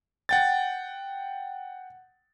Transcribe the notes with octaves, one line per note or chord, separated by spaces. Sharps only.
F#5 G5 A6